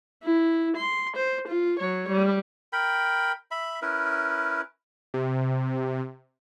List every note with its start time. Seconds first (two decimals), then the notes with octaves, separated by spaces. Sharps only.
0.23 E4
0.76 C6
1.16 C5
1.47 F4
1.79 F#3 C#5
2.09 G3
2.73 A#4 G5 B5
3.51 E5 B5
3.82 C#4 E4 A#4 B4
5.14 C3